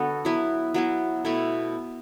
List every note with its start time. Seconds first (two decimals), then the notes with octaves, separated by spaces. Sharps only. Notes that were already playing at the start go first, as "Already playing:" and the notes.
Already playing: D3 B3 F#4 A4
0.25 F#3 B3 E4
0.74 F#3 B3 E4
1.25 B2 A3 E4 A4